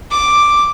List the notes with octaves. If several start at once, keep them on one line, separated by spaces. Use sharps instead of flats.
D6